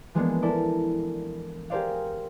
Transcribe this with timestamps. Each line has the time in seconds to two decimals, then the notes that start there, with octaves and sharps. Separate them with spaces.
0.14 E3 F3 G#3 A#3 B3 D4
0.42 E4 A4 A#4 D5
1.70 G4 G#4 A#4 C5 D5 F5